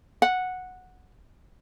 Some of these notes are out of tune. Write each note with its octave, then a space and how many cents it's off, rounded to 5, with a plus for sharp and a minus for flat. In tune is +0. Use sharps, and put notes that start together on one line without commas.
F#5 -10